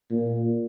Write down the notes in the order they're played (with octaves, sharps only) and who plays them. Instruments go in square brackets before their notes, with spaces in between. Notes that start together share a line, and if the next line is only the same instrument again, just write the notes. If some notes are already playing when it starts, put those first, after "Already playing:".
[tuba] A#2